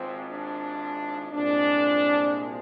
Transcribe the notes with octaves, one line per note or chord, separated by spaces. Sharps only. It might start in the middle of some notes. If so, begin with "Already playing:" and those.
Already playing: G#1 G#2 F3 C4
D4
C2 A#2 F3 G#3 D4